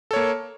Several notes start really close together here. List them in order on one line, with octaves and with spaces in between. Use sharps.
A4 C#5 A#3